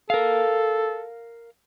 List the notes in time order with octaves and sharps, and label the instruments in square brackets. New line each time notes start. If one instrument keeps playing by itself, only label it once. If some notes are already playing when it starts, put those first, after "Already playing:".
[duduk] A4 [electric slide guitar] A#4 F5